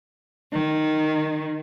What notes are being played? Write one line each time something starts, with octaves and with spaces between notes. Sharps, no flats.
D#3